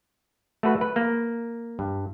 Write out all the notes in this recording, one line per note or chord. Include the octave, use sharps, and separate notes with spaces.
A3 F#4 B4
B4
A#3
G2